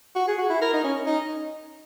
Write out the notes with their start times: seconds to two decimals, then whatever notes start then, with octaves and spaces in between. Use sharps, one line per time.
0.15 F#4
0.27 G#4
0.38 F#4
0.50 E4
0.61 A#4
0.73 D#4
0.84 C#4
1.06 D#4